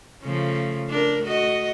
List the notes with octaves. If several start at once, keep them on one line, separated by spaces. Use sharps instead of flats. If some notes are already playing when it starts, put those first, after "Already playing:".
C#3 F3 A3
D4 A#4
A3 F#4 D#5